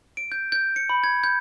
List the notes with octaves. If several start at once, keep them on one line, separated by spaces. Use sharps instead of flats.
D7
G6
G6
C#7
B5
G#6
G6